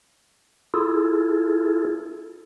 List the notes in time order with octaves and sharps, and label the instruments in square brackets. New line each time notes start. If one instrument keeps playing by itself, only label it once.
[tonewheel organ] E4 F4 G#4 A4